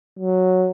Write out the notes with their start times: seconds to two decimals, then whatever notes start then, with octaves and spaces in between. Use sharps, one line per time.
0.19 F#3